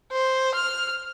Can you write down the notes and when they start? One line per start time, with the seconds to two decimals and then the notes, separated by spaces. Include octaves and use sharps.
0.12 C5
0.55 F6